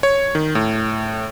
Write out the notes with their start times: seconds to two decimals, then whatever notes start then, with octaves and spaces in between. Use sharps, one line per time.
0.03 C#5
0.35 D#3
0.55 A2